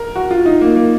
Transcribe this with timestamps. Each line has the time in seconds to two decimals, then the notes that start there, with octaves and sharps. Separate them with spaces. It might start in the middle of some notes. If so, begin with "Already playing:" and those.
Already playing: A#4
0.16 F#4
0.31 F4
0.46 D#4
0.61 A#3
0.76 A#3